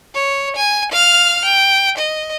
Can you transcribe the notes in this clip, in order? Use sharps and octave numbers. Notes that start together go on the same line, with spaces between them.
C#5
G#5
F5 F6
G5
D#5